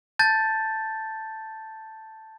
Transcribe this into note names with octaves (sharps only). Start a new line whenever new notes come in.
A5 G6 A6